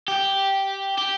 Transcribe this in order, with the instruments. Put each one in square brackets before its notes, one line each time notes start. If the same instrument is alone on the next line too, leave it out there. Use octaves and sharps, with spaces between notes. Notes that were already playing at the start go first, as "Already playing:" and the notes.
[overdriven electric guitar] G4
G4